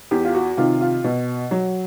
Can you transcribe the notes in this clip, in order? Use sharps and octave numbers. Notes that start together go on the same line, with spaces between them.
E2 G4
F4
F#4
C3 D#3 F4
F4
B2
F#3